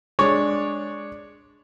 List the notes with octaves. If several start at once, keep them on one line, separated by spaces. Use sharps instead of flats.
G#3 D4 C#5 D5